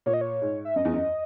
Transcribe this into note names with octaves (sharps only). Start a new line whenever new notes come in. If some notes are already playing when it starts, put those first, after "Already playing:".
A#2 C#5
D#5
C#5
G#2
E5
F#2 D#5
E2
F#2